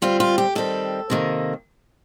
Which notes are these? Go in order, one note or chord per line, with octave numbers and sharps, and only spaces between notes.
D3 G3 C4 F4
F4
G4
D#3 G3 C4 A4
C3 D#3 A#3